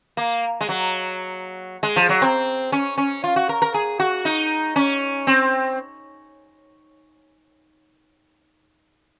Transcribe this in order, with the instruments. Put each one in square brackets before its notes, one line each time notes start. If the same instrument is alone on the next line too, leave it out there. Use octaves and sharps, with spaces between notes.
[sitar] A#3
G#3
F#3
G#3
F3
F#3
C4
C#4
C#4
F4
F#4
A#4
A#4
G#4
F#4
D#4
C#4
C4